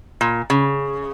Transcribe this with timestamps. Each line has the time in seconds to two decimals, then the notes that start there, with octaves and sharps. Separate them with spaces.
0.21 A#2
0.50 C#3